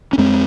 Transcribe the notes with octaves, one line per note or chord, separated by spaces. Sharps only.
C#4
F2 G#3 C4